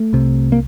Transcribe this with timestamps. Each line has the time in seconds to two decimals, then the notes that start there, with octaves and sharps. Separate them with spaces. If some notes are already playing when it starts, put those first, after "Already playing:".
Already playing: A3
0.13 C2 C3
0.52 A#3